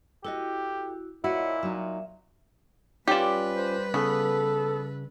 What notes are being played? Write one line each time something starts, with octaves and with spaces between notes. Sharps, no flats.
E4 F#4 G4 A4 D#5
A#2 E4 F#4 C#5 D#5
F#3 D#4 E5
G3 C#4 F4 G4 B4 D5
C5
C#3 B3 A4